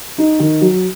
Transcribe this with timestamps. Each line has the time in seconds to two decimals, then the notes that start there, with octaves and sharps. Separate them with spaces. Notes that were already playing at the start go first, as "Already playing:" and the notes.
0.18 D#4
0.40 D#3
0.61 F#3